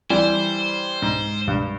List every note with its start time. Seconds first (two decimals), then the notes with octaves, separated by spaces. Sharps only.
0.10 E3 G3 C5
1.02 G#2
1.48 G2